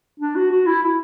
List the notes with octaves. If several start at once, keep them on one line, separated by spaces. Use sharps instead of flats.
D4
F#4
F#4
E4
E4